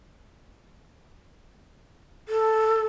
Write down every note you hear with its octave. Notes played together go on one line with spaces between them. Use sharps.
A4